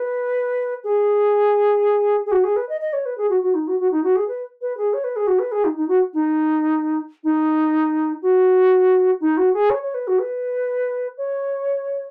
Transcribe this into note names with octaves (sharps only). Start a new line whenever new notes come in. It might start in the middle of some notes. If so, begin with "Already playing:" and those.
Already playing: B4
G#4
G#4
F#4
G#4
B4
D#5
D#5
C#5
B4
G#4
F#4
F#4
D#4
F#4
F#4
D#4
F#4
G#4
B4
B4
G#4
C#5
B4
G#4
F#4
B4
G#4
D#4
D#4
F#4
D#4
D#4
F#4
D#4
F#4
G#4
C#5
C#5
B4
F#4
B4
C#5